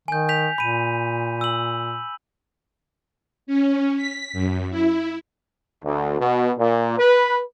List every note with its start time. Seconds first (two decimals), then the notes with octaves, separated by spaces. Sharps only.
0.08 D#3 G#5 G6
0.29 G6 B6 F7
0.58 A#2 B5 D#7
1.41 E6 F#7
3.47 C#4
3.97 B6
4.33 F#2
4.70 E4
5.84 D2
6.20 B2
6.57 A#2
6.98 B4